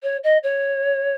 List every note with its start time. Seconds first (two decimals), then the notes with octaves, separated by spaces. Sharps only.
0.03 C#5
0.23 D#5
0.43 C#5